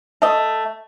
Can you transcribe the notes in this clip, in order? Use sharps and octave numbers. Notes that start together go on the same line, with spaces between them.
A3 D#5